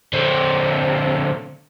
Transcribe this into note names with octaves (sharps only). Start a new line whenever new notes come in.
D3 C4